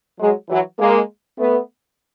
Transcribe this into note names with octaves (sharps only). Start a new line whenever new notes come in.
F#3 G#3
E3 F#3
G#3 A#3
A3 B3